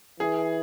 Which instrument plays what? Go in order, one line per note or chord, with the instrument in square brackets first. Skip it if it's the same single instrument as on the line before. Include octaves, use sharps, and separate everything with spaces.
[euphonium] E3 [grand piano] G#4